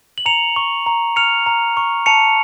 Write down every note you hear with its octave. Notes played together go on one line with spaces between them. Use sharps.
F#7
A#5 C#7 F7
C#6
A#5
F6 C#7 F7
A#5
C#6
A5 C#7 F7